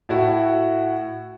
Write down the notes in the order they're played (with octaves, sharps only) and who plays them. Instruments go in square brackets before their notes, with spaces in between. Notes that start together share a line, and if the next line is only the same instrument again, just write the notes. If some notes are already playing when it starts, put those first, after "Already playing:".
[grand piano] A2 E4 F#4